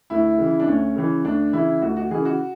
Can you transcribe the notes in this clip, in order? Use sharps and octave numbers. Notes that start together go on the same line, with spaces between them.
D2 E4
C#3 E3
D4
D2 C#4
C#3 E3
D2 D4
C#3 E3 E4
D2 F#4
F#4
C#3 E3 G#4
F#4